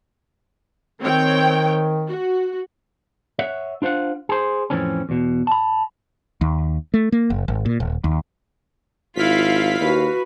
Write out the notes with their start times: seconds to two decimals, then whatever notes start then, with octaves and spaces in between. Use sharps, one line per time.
1.01 D#3 C4 C#5 G5
2.09 F#4
3.39 C#5 E5 F#5
3.82 D4 F4 C5 F5 F#5
4.29 G#4 C5
4.70 F2 A2 E3 C4 C#4
5.09 E2 B2
5.47 A5 B5
6.41 D#2
6.94 A3
7.12 A#3
7.30 F#1
7.48 G#1
7.66 A#2
7.80 D#1
8.04 D#2
9.16 G#1 E4 F4 F5 B6
9.80 D#2 F#4 B4